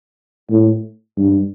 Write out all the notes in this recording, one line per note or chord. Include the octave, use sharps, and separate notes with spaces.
A2
G2